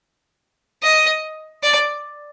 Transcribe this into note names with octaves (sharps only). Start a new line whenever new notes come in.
D#5
D5